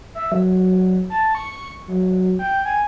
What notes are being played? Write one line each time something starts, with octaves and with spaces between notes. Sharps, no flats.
E5
F#3
A5
C#6
F#3
G5
G#5